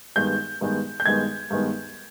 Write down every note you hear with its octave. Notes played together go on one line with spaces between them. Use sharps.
G2 D#3 G#3 B3 G6
G2 D#3 G#3 B3
G6
G2 D#3 G#3 B3 G#6
G2 D#3 G#3 B3